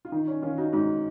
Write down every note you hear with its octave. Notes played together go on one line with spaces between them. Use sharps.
F4
D#3 D#4
C#4
D#3 C#4 F4
D#4 F#4
G#2 D#4 F#4